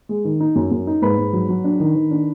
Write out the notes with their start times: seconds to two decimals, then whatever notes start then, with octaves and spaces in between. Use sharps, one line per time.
0.09 G#3
0.25 D#3
0.40 D#4
0.55 F#2
0.71 F#2
0.87 D#4
1.02 G#2 B4 B5
1.18 G#2
1.33 F#3
1.49 F#3
1.64 D4
1.80 D#3
1.95 D#3
2.11 D4